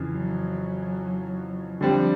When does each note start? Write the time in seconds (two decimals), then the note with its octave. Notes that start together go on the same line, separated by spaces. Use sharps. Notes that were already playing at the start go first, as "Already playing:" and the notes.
Already playing: F2 C#3 E3
0.11 F#3
1.81 D3 F3 G3 C4